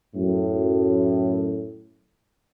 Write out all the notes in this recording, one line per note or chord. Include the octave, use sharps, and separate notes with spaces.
F#2 A2